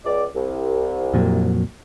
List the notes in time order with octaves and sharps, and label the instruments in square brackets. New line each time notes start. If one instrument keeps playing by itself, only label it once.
[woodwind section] C#2 D5
C2
[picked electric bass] F2 A#2 F#3